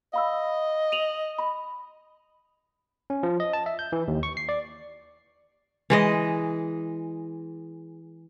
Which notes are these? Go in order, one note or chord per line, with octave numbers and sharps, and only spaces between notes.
D#5 F5 B5 E6
D#7 F7 F#7
B5
C#4
F3
D#5
A5
E5
G6
E3
D#2
C#6
C7
D5
E3 G#3 D#5